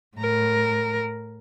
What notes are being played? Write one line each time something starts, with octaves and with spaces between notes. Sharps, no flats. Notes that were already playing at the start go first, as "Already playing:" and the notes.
A2 A#4